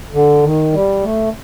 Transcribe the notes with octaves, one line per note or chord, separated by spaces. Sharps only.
D3
D#3
G3
A3